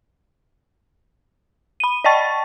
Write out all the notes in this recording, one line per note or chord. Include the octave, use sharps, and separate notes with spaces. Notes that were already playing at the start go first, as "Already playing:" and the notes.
B5 D#7
D5 D#5 G5 A5 C#6 A6